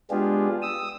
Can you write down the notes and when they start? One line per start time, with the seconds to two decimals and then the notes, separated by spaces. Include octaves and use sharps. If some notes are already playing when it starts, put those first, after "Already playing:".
0.11 G#3 B3 D4 F4 G4 G#4
0.62 D#6 E6